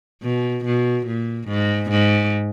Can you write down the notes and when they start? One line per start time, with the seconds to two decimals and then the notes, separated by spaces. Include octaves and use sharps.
0.23 B2
0.65 B2
1.07 A#2
1.48 G#2
1.91 G#2